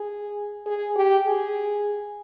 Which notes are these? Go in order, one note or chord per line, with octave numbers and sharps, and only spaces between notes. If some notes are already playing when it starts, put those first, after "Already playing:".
Already playing: G#4
G#4
G4
G#4